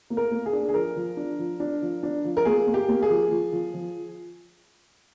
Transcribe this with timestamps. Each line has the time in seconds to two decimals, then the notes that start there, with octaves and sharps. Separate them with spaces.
0.10 A#3
0.17 A#4
0.31 A#3
0.46 G#4
0.53 D4
0.69 G#4
0.74 F3 A#4
0.96 F3
1.17 D4
1.39 F3
1.60 D4
1.82 F3
2.03 D4
2.24 F3
2.37 A#4
2.45 A#3 G#4
2.67 A#3
2.74 G4
2.89 A#3
3.02 G#4
3.10 F3
3.31 F3
3.52 F3
3.74 F3